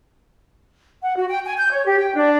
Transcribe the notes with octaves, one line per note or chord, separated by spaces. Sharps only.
F#5
F#4
G5
G#5
G6
C#5
G4
G5
D4